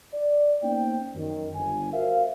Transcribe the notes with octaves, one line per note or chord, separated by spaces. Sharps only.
D5
A#3 B3 C#4 D#4 C5 G5
F#2 D#3
G1 G#5
F#4 A#4 C5 E5 F5